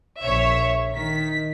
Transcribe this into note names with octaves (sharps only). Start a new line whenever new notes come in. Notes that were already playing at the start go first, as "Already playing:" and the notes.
A#1 C#5 E5
D#3 B6